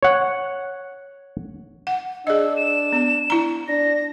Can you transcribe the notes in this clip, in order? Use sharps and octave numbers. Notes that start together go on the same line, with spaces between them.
C#5 F#5
F#5
D4 G#4 D#5 E6
E7
B3
E4 A#5
D4 A#6